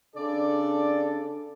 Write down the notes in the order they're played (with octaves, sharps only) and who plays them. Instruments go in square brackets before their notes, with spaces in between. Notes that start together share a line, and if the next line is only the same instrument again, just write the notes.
[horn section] C#3 D4 D5 [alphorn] A4